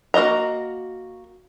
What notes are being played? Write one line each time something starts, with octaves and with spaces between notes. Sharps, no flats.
A#3 F#4 C5 D#5 A#5